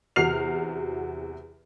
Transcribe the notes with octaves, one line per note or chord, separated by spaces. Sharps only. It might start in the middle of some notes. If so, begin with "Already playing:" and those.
E2 C3 F#4 F6 C7 F7